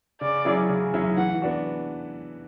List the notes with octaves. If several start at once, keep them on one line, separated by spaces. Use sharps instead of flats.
C#3 D5
F#3 C#4 E4 G#4
C#3
F#3 C#4 E4 G#4
E3 F#5
B3 D4 F#4